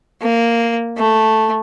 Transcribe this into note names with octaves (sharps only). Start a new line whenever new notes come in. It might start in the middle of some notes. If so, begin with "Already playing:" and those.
A#3
A3